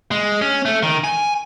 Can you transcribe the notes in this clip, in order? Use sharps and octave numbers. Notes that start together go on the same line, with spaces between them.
G#3
C#4
A3
D#3
G#5